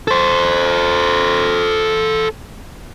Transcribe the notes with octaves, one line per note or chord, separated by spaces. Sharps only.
A4 C5